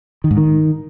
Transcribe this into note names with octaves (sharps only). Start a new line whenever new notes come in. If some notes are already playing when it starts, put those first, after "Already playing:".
D#3
G#2
D#3